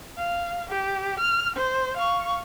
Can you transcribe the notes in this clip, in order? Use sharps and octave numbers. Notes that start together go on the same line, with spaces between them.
F5
G4
F6
C5
F5 C#6